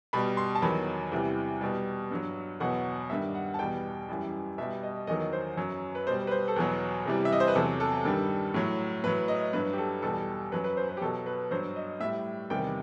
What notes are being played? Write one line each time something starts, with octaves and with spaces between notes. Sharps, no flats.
B2 G3 B5
C6
A5
E2 D#3 F#3 B5
E2 C3 E3 G3
B2 G3
G2 F#3
E2 B2 F#3 F#5
G2 D#3 G3 E5
F#5
A5
E2 B2 G3 G5
F#2 E3 G3
B2 G3 E5
D#5
E2 D#3 F#3 D#5
C5
F#2 F#3
B4
B2 G3 C5
B4
C5
A4
E2 B2 F#3 B4
E2 C3 E3 G3
E5
D#5
C5
B4
E2 C3 F#3 A4
A4
G2 D#3 G3
A2 F#3
A2 F#3 B4
D#5
G2 F#3 B4
G4
A4
E2 B2 G3 A4
F#2 F#3 B4
B4
C5
B4
G4
B2 F#3 A4
B4
G2 F#3 C5
D#5
A2 G3 E5
E2 C3 D#3 G3 G5